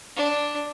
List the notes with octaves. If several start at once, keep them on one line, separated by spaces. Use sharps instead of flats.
D4